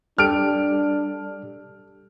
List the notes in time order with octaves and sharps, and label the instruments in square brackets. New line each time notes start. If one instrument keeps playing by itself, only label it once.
[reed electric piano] G3 G4 A4 [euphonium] D4 [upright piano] F6 D7